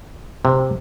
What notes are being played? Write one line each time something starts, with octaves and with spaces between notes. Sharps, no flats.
C3